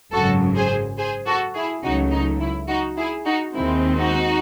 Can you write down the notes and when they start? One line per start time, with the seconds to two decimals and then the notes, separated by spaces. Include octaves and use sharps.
0.12 G#1 F#2 C#3 F#3 F#4 A4
0.56 G#4 C5
0.98 G#4 C5
1.26 F#4 A4
1.55 E4 G#4
1.83 C#2 C#3 F#3 A3 D#4 F#4
2.12 D#4
2.40 E4
2.68 D#4 F#4
2.97 E4 G#4
3.25 D#4 F#4
3.54 D#2 D#3 G#3 C4 E4
3.96 D#4 F#4